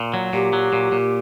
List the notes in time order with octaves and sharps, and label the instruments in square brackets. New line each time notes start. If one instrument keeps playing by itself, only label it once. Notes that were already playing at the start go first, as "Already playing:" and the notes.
Already playing: [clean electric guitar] A#2
F#3
[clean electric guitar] A#2 [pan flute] G4
[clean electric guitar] F#3
A#2
A#2